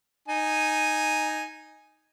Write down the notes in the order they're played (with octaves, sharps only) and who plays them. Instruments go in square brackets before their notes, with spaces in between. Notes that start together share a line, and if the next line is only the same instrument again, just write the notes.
[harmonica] D#4 G#5